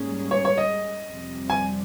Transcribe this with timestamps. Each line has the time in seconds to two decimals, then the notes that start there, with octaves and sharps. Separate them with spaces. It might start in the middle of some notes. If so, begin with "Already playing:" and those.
Already playing: G#2 G3 A#3 C#4 G#4
0.31 C#5
0.45 C#5
0.58 D#5
1.10 F2 C3 G3
1.50 G#5